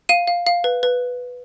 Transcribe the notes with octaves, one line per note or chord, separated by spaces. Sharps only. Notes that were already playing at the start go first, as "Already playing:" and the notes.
F5 D#7
F5
F5
B4
B4